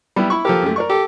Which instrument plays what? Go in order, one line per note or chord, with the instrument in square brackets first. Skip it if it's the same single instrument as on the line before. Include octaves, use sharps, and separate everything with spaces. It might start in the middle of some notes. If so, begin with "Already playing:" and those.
[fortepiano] G3 B3 E4
E4 B5 C#6
[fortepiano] F3 A4 A#4 [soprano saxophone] G4
[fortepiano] F#2 A3
A#4 D5 C#6
[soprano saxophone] G4 [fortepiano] A4